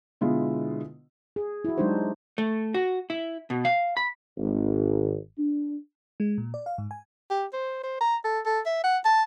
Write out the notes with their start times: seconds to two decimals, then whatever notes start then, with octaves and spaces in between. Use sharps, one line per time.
0.21 B2 D3 G#3 E4 F4
1.36 G#4
1.64 E4 F#4
1.77 F#3 G#3 D4 D#4 G4 C5
2.38 A3
2.74 F#4
3.10 E4
3.50 B2
3.65 F5
3.97 B5
4.37 G#1
5.38 D4
6.20 G#3
6.38 A#2
6.54 D5
6.66 F5
6.78 G#2
6.91 G#5
7.31 G4
7.53 C5
7.84 C5
8.01 A#5
8.25 A4
8.46 A4
8.66 E5
8.84 F#5
9.05 A5